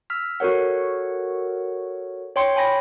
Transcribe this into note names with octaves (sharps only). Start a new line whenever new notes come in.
E6 F6 B6
F#4 A4 A#4 C#5 F#5
C#5 G5 C6 C#7
C#5 G5 G#5 B5 A#6